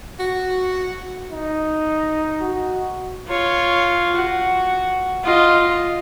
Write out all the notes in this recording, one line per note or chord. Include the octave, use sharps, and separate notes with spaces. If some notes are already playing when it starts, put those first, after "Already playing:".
F#4
D#4
F#4
F4 C#5
F#4
F4 D#5